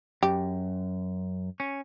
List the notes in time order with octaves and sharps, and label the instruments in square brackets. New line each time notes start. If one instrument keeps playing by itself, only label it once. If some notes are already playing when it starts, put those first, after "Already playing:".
[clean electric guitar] F#2 [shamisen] G4
[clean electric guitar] C#4